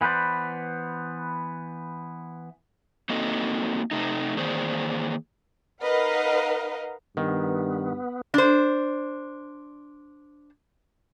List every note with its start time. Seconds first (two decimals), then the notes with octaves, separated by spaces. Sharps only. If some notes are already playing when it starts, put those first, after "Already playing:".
0.01 E3 B3 B4 C5 D5
3.09 A#3 C4 D#4 F#4 A4 D#5
3.91 C3 A3 D#4
4.37 D#3 E3 A#3 G#4 C5 D5
5.83 D#4 A#4 B4 D#5 F5 F#5
7.17 G2 D#3 B3
8.34 D4 C5